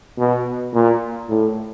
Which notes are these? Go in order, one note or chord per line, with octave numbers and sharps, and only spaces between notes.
B2
A#2
A2